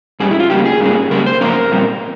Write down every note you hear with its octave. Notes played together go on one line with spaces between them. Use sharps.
G2 G3 C#4 G#4
E4
F4
C#3 G3 A#3 G4
G#4
G#2 G3 A#3 C#4
C#3 G3 A#3 A#4
C5
G#2 F3 A#3 C#4 A#4
A#2 G3 C4